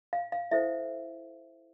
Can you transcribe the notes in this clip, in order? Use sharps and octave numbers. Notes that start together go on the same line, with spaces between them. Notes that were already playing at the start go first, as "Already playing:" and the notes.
F5
F5
E4 A4 C5 E5